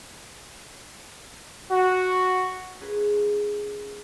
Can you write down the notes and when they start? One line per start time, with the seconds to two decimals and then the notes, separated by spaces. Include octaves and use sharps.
1.71 F#4
2.81 C#4 F4 G#4 A#4 B4